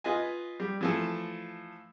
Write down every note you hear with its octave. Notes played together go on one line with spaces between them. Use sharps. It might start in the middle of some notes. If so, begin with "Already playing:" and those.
F4 B4 D#5 G#5
G3
E3 F3 A3